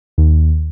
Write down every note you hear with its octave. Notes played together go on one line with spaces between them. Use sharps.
D#2